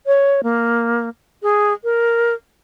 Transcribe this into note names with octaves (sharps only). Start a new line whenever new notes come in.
C#5
A#3
G#4
A#4